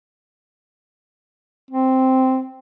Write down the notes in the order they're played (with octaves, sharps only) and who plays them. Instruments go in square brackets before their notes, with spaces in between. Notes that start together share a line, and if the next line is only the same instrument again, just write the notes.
[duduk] C4